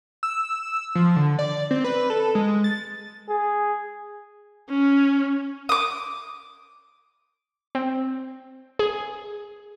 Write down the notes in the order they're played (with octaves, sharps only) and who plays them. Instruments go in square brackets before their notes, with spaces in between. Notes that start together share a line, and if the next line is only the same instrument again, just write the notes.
[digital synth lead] E6
F3
D3
D5
C4
B4
A4
G#3
A6
[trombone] G#4
[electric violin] C#4
[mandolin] D6 D#6
[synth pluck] C4
G#4